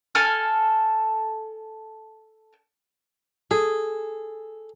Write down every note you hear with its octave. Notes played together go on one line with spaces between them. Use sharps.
A4 G#5 F6
G#4 A4